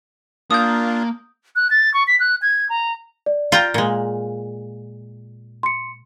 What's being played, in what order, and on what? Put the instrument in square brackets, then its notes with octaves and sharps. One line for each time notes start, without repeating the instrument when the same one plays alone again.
[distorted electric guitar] A#3 [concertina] D4 F4 [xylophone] D#6 G6
[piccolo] F#6
A6
C#6
B6
F#6
G#6
A#5
[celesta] D5
[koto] F4 G5 A#5
A#2 G#3
[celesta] C6 C#7